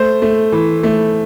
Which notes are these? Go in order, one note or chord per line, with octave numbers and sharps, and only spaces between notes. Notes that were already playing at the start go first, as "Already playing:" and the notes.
Already playing: A3 C5
A3
E3
A3